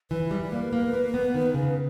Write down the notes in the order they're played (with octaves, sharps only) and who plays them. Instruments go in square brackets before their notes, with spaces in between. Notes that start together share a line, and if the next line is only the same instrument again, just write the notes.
[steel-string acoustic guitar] E3 [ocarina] B4
[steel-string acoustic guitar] G3
A#3
A#3
A#3
B3
D#3
C#3